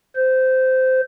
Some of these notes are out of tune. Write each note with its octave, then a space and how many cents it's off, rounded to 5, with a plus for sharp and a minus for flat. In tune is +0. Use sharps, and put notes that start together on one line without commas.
C5 -15